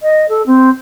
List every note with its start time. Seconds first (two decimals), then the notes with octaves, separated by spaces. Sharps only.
0.02 D#5
0.29 A4
0.46 C4